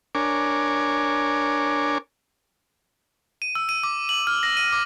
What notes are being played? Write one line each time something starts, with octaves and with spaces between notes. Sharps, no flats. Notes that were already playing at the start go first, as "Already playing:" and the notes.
D4 A#4 C#5 G#5 D6
D#7
E6
D#7
D6
F#7
F6
A#6
D#7
D6